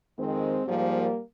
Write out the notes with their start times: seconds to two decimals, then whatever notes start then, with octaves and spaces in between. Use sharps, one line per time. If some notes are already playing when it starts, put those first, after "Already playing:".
0.18 F2 D#3 G#3 C4
0.68 G#2 F3 G3 A#3